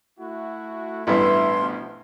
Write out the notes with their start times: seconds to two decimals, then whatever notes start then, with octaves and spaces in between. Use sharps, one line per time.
0.19 A3 E4 F#4
1.07 A1 G2 B3 E4 E5 C6
1.60 B2 F3